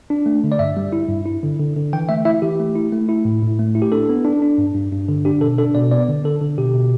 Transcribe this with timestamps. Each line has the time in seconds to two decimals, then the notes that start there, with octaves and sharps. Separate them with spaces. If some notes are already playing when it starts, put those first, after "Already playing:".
0.10 D4
0.26 A3
0.44 D3
0.52 D5
0.59 G2 E5
0.77 G3
0.93 E4
1.09 G2
1.26 E4
1.43 D3
1.59 D3
1.76 D3
1.93 E3 G5
2.09 A3 E5
2.25 E4 E5
2.42 E3 G4
2.59 A3
2.75 E4
2.92 A3
3.09 E4
3.25 A2
3.42 A2
3.59 A3
3.75 E4
3.82 G4
3.92 D4 A4
4.09 B3
4.25 D4
4.42 D4
4.58 G2
4.75 G2
4.92 G2
5.09 D3
5.25 D4 G4
5.41 B2 A4
5.58 D4 A4
5.75 B2 D5
5.91 B3 D5
6.09 D3
6.24 D3 A4
6.41 D3
6.58 B2 G4
6.74 B2